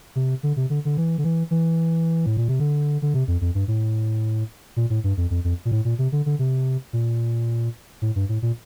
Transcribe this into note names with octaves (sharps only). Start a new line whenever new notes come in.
C3
D3
C3
D3
D3
E3
D3
E3
E3
A2
A#2
C3
D3
D3
C3
F2
F2
G2
A2
A#2
A2
G2
F2
F2
F2
A#2
A2
A#2
C3
D3
D3
C3
A#2
A2
G2
A2
A#2